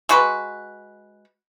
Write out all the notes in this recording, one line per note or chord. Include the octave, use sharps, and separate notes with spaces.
G#3 F#4 B4